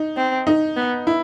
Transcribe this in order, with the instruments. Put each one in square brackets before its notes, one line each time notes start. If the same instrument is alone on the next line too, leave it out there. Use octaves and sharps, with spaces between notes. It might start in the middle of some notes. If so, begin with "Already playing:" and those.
Already playing: [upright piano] D#4
[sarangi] C4
[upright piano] D#4
[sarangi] B3
[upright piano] E4